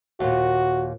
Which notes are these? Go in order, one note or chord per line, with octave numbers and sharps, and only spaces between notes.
D#2 A#2 F#4